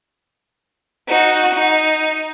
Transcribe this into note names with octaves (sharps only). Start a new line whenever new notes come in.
D#4 F#4
D#4